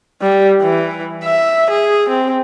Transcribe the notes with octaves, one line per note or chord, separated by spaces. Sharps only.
G3
E3
E5
G#4
C4